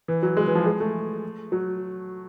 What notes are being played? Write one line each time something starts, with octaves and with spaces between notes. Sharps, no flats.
E3
F#3
G#3
E3
F3
G#3
A3
F#3